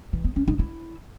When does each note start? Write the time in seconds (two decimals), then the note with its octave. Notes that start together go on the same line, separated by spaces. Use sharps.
0.13 E3
0.25 B3
0.36 C#4
0.48 D#4
0.59 E4